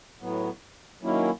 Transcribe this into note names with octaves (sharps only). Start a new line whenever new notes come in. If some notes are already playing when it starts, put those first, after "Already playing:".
A2 F#3 B3
D#3 F#3 A#3 C#4 E4